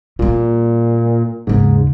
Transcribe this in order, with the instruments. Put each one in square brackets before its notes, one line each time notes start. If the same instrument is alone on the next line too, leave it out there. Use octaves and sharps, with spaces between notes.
[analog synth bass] A#2 [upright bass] G3 A#3
[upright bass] D#2 C#3 [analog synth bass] G#2